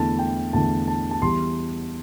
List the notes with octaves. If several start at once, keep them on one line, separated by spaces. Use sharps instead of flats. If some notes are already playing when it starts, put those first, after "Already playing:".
Already playing: E2 D3 A3 E4 A5
G5
E2 D3 A3 E4 A5
A5
A5
E2 E3 G3 C6